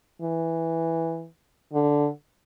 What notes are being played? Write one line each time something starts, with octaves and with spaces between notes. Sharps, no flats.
E3
D3